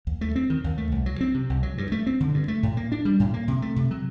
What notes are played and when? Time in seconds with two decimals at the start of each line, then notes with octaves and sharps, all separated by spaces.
0.07 D#2
0.21 A3
0.36 C4
0.50 D#3
0.64 D#2
0.78 A3
0.92 C2
1.06 F#3
1.21 C4
1.34 C3
1.50 C2
1.63 F#3
1.78 G2
1.92 A3
2.07 C4
2.20 D3
2.34 G2
2.48 A3
2.63 A2
2.77 A#3
2.92 D4
3.05 G3
3.20 A2
3.34 A#3
3.48 C3
3.62 A3
3.76 C3
3.91 F#3